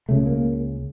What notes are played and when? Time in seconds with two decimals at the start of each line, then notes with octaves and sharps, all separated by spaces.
0.09 C#2 C#3 A3
0.26 A#3